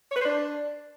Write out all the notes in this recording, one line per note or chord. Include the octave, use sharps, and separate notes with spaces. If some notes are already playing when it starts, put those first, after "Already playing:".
C#5
B4
C5
D4